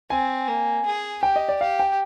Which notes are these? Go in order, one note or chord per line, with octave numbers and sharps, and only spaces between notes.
C4 G#5
A#3
G#4
G4 G5
D#5
D5
G4 F5
G5